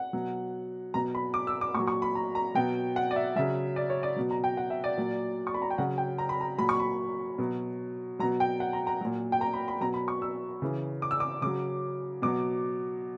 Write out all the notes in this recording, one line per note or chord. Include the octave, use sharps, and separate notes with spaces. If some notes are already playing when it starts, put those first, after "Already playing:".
Already playing: F#5
B2 F#3
B2 F#3 A#5
B5
D6
E6
D6
A#2 C#6
F#3
C#6
B5
A#5
A#5
B2 F#3 G5
F#5
D5
E5
C#3 F#3 E5
D5
C#5
D5
B2 F#3
A#5
G5
F#5
E5
D5
A#2 F#3
C#6
B5
A#5
G5
C#3 F#3 F#5
G5
A#5
B5
A#5
A#2 F#3 B5
C#6
B5
B2 F#3
B2 F#3 A#5
G5
F#5
A#5
A#5
A#2 F#3
G5
A#5
B5
B5
B2 F#3 A#5
B5
C#6
E6
C#3 E3
D6
E6
D6
C#3 F#3 D6
B2 F#3 D6